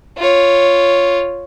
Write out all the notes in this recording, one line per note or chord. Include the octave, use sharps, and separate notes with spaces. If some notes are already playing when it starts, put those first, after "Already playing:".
F4 C#5